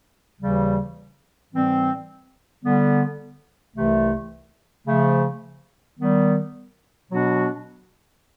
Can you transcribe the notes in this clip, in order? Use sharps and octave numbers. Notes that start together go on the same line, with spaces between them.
D#2 C#3 E3 G3
G#2 E3 G3 C4
D3 G3 B3
C2 C3 E3 A3
C#3 F3 A3
D#3 G3 B3
B2 F#3 B3 D4 F#4